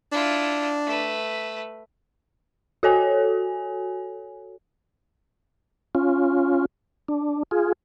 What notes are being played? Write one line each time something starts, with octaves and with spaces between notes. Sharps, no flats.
D4 E4 F4
A3 B4
F#4 A4 C#5 G#5
C#4 F4
D4
F4 G#4